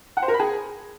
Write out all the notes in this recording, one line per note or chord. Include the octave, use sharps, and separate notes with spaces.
F#5
C5
A#4
B5
G#4